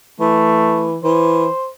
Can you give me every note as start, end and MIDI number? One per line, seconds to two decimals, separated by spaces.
0.20 0.98 52
0.20 0.91 57
1.04 1.48 52
1.04 1.69 72